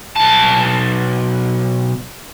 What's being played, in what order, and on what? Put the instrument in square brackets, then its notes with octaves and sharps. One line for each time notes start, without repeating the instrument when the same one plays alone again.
[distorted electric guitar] B1 A5